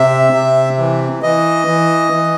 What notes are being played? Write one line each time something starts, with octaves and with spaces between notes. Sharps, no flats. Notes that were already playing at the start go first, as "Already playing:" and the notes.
Already playing: C3 E5
C3
E3
E3 D#5
E3
E3